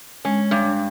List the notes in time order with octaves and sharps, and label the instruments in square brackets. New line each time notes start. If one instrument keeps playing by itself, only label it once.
[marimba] G#3 [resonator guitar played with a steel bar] C#4
[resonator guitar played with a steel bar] G2